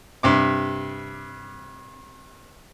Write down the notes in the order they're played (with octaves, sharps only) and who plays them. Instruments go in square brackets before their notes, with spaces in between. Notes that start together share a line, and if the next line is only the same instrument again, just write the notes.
[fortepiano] G2 C3 D6